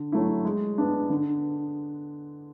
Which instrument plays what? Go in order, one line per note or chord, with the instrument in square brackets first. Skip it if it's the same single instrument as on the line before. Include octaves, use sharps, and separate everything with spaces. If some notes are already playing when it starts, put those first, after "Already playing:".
Already playing: [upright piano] D3
F#3 A3 E4
G#3
B3 D4
D3